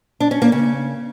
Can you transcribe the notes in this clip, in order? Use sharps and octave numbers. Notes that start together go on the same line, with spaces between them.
D4
C#4
A#3
C#3